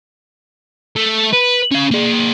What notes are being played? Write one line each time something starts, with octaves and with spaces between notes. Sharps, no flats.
A3
B4
C#4 F5
A#3 G#4